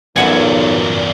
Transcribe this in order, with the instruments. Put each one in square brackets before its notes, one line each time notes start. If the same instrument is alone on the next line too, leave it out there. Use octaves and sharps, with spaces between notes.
[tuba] B1 [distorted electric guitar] E2 G2 [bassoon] A#2 [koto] E5 F#5 G#5